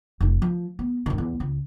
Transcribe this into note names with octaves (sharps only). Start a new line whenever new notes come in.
F1 D#4
F3
B3
D1 D#3
E2
C#2